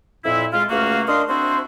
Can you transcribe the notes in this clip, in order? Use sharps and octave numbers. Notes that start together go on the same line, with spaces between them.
F2 A#2 E4
G#3 F4
C#2 A3 A#3 F#4 F5
D4 A#4 D#5 F5 C6
C4 D4 E4 F#4 C5